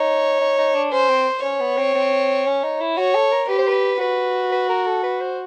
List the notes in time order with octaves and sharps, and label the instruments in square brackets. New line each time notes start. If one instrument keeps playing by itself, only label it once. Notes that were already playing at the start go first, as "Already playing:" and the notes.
Already playing: [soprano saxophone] D#4 [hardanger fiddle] C#5
[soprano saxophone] D#4
D#4
D4
[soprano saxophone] C#4 [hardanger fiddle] C5
[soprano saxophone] C4
[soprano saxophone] C#4 [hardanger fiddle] C#5
[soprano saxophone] B3
C4
C4
C#4
D#4
E4
[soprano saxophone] F#4 [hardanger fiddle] C#5
[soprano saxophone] A4
A#4
[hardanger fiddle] G4 [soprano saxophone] B4
[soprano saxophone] C5
B4
[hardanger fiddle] F#4 [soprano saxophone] B4
[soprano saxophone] B4
A#4
A4
B4
C5